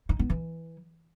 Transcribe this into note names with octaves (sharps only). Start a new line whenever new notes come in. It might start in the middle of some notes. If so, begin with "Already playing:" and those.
D#4
B3
E3